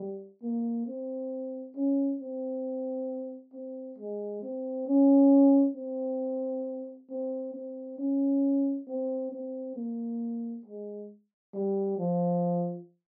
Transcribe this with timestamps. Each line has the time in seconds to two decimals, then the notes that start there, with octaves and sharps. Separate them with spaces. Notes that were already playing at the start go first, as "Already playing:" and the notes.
Already playing: G3
0.43 A#3
0.87 C4
1.76 C#4
2.21 C4
3.53 C4
3.98 G#3
4.42 C4
4.87 C#4
5.76 C4
7.10 C4
7.54 C4
7.99 C#4
8.88 C4
9.32 C4
9.76 A#3
10.66 G#3
11.54 G3
11.99 F3